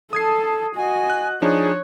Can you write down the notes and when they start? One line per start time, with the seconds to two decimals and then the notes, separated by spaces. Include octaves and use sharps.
0.13 A4 A5 D#6 G#6 C7
0.76 F#4 D#5 G#5
1.10 F#6
1.42 F3 D4 D#4 G#4 C#5